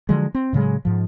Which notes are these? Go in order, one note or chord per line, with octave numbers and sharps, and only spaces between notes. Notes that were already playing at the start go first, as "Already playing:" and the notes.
D3 F3 F#3 G#3
C4
A2 C#3 F#3 G#3
G#2 F3